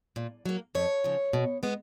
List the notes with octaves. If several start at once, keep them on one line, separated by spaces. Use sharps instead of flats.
A#2
F#3 A#3
F2 C#5
C#3 F3
B2
G#3 B3